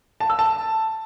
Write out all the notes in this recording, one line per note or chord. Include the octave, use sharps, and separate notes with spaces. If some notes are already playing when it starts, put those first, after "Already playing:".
A5
E6
A5